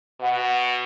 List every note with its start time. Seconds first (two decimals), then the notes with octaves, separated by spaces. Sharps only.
0.20 B2 F#5